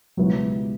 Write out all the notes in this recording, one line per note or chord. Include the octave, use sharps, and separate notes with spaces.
C#2 B2 F#3 G3 B3 E4